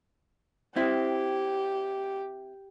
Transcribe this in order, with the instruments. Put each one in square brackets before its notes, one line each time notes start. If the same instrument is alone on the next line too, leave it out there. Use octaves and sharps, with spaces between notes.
[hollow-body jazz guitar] C4 E4 [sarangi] G4